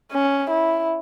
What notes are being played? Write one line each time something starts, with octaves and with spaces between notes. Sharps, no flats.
C#4
E4